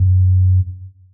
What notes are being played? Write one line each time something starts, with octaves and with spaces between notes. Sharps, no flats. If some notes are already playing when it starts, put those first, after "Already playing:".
Already playing: F#2